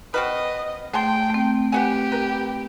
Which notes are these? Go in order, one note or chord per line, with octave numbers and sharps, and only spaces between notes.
C4 F#4 B4 D#5 F6
A3 G#4 G5 A5 C6
A3 C4
G4 B4 F#5 G#5
A#4 B4